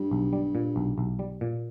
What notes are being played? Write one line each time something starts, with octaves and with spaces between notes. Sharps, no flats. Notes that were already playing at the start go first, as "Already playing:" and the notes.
Already playing: G2
B1
G3
A#2
B1
B1
G3
A#2